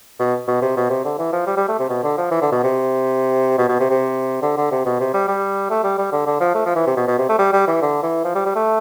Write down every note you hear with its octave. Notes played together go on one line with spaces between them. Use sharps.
B2
B2
C3
B2
C3
D3
E3
F3
G3
G3
A3
C3
B2
D3
F3
E3
D3
B2
C3
B2
B2
C3
C3
D3
D3
C3
B2
C3
G3
G3
A3
G3
G3
D3
D3
F3
A3
F3
E3
C3
B2
B2
C3
A3
G3
G3
E3
D3
E3
F3
G3
G3
A3